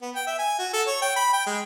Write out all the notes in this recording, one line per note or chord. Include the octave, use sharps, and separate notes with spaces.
B3
G5
E5
G#5
F#4
A4
C#5
G5
B5
G5
G#3